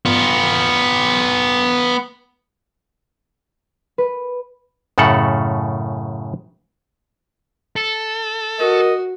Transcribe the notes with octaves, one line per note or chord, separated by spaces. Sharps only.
B3 F4
B4
F#2 A2 C#3 A4 F#5
A4
F#4 A#4 D#5